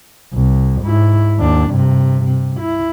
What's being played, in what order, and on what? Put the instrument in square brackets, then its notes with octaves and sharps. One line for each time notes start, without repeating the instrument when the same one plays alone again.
[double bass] C2
G#2 E4
D#2 D4
G2 C3
C3
E4